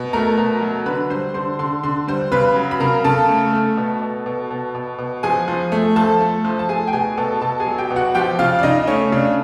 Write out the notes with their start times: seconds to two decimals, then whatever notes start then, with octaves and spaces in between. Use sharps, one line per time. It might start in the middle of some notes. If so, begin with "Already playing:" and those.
Already playing: B2
0.13 A3 A#4 A#5
0.37 B2
0.62 F#3
0.86 D3 B4 B5
1.10 G3 C5 C6
1.34 D3 C5 C6
1.59 D3 C6
1.83 D3 C6
2.07 G3 C5 C6
2.32 C#3 B4 B5
2.56 F#3
2.71 B5
2.80 C#3 A#4 A#5
3.04 C#3 A4 A5
3.28 A3
3.53 A3
3.77 B2
4.02 B2
4.26 B2
4.51 B2
4.75 B2
4.98 B2
5.23 F3 G#4 G#5
5.48 F3
5.72 A3
5.96 F3 A4 A5
6.20 A3
6.45 F3
6.59 A5
6.69 A3 G#4 G#5
6.88 G5
6.93 B2 G#4 G#5
7.17 B2 A4 A5
7.41 B2 A4 A5
7.60 G#4 G#5
7.67 F#3
7.78 G4 G5
7.91 B2
7.96 F#4 F#5
8.15 F3 G4 G5
8.39 C#3 F4 F5
8.59 D5
8.63 C#3 D#4 D#5
8.87 A3 C#4 C#5
9.12 C#3 D4 D5